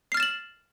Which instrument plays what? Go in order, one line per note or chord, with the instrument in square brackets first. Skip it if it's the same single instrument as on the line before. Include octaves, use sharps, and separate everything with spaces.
[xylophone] C7
F6
A6
E7
F#7